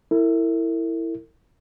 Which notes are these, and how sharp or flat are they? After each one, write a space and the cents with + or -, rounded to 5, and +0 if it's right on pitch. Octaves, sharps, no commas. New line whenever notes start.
E4 +0 A#4 -45